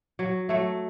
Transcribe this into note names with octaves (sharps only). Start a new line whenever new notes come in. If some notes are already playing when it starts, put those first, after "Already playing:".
F#3
F#3 A3